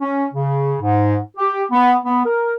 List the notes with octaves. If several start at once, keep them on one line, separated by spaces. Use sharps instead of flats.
C#4
C#3
G#2
G4
B3
B3
A#4